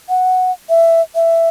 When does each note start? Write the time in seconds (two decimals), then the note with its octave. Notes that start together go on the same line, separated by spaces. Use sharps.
0.09 F#5
0.69 E5
1.15 E5